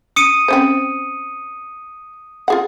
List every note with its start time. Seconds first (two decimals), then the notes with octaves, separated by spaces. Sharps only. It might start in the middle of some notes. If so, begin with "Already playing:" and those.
0.16 D#6 C#7 D#7
0.48 C4 C#4 C5
2.48 F4 G#4 F#5